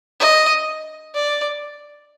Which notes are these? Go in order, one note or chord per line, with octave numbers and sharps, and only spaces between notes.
D#5
D5